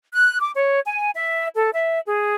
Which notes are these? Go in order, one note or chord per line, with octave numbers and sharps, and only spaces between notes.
F#6
D6
C#5
G#5
E5
A4
E5
G#4